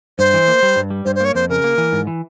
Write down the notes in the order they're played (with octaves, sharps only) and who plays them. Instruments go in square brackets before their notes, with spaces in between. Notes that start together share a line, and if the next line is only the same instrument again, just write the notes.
[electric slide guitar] G2 [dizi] C5
[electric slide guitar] E3
A#3
G3
G2
G3
[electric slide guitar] G2 [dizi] C5
[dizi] C5
[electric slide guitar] A#3 [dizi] C#5
[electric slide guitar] F2 [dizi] C5
[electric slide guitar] C#3 [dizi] A#4
[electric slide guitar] A#3
E3
G#2
E3